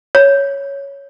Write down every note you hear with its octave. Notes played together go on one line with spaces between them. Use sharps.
C#5